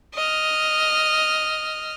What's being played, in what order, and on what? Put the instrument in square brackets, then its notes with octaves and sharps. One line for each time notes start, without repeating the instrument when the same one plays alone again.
[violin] D#5 F6